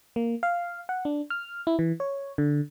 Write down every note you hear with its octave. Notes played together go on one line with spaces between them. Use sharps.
A#3
F5
F#5
D4
F6
E4
E3
C#5
D3